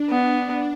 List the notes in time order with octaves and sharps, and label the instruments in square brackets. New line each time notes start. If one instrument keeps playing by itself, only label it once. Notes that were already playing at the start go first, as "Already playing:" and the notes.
Already playing: [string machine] D4
[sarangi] B3